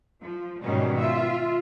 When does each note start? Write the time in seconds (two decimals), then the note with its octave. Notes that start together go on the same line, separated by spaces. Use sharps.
0.21 F3
0.62 G#2 B2 D#3 G3 C#4
1.00 F4 E5